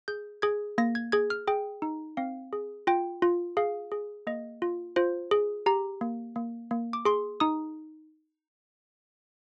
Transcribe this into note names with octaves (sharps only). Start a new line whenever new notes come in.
G#4 G6
G#4 G#6
A#3 A#6
G#6
G#4 G#6
F6
G#4 G5
D#4
C4 F5
G#4
F4 G5
F4
G#4 F5
G#4
A#3 D#5
F4
F4 C5
G#4
G4 A#5
A#3
A#3
A#3
D6
G#4 C6
D#4 D#6